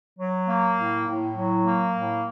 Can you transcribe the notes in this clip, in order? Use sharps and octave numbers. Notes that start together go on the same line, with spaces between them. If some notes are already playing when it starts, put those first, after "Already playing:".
F#3
A#3
A2
A2
F#3
A#3
A2